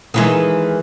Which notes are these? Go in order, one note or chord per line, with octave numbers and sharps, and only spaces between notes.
D#3 E3 G#3